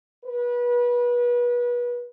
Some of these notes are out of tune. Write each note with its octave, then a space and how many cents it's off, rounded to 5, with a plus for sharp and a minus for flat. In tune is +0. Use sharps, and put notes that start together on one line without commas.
B4 -30